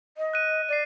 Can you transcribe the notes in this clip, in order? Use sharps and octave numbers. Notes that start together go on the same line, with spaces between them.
D#5
F#6 D#7
D5 C7 D#7